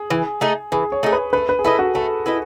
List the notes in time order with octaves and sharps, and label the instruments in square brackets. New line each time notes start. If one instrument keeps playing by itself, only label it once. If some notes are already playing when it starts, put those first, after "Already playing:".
Already playing: [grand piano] G#4
[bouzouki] E3
A3 D#4 G#4
[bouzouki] E3 [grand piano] G#4
[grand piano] C#5
[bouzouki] A3 D#4 G#4
[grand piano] B4
[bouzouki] A3 [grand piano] B4
[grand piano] B4
G#4
[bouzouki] E4 B4 D#5 [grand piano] A4
[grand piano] F#4
[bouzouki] A3 [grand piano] A4
[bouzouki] E4 B4 D#5